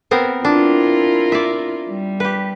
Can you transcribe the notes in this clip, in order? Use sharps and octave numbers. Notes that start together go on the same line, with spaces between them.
B3 C4 A#4
D4 E4 F4 A#4
D5 E5
G3
G4 B4